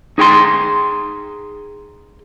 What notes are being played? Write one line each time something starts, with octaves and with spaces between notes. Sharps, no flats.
D#4 G#4 G5 C6